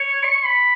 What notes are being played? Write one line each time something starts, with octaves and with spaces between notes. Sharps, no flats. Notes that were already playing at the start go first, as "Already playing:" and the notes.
Already playing: C#5
C#6
B5